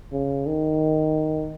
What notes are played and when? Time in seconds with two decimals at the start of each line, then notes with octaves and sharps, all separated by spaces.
0.12 C#3
0.47 D#3